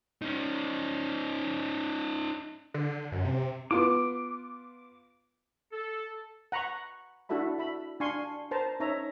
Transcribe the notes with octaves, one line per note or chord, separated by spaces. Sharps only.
C#4 D#4
D3
F#2
C3
B3 F4 D6
A4
F#5 A#5 B5 C#6
D4 E4 F#4 A4 E5 B5
E5 B5
D4 F5 G#5 C6 C#6
A#4 C5 A5 A#5
C#4 D#4 C#5 E5 A#5